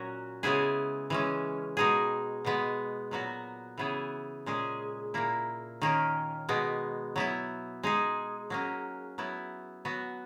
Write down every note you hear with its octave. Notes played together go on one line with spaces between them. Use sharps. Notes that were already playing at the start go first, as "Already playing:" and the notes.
Already playing: A#2 F#3 C#4 F#4
C#3 G#3 B3 E4 G#4
E3 G#3 C#4
B2 G#3 D#4 G#4
B2 G#3 B3
A#2 F#3 B3 F#4
C#3 E3 B3 E4 G#4
A#2 G#3 C#4 G#4
A#2 A#3 E4
D#3 A#3 C#4
B2 G#3 B3
F#3 B3 E4
G#3 D#4 G#4
F#3 A#3 C#4
F#3 B3 E4
F#3 B3 F#4